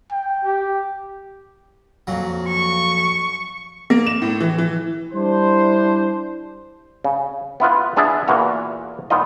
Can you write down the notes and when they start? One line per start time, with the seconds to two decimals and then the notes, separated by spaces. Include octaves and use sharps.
0.12 G5
0.44 G4
2.07 F2 A#2 F#3
2.49 C#6
3.90 A#3
4.07 E7
4.22 A2
4.40 E3
4.58 E3
5.13 G3 D4 E4 C5
7.04 C#3
7.60 B3 E4 F4 B4
7.96 B3 D4 G#4 D5 E5
8.28 E2 A#2 E3 A#3 F#4 A#5
9.10 A#2 B3 D#4 F4 D#5